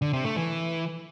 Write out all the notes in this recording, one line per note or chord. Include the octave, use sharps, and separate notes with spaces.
D3
C3
A3
E3